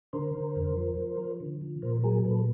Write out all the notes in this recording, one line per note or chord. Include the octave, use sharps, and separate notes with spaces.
D3 A#4 C5
D3
F2
F3
F3
F3
D3
F3
A#2 A#4 C5
F#3 G#4 A#4
A#2 A4 B4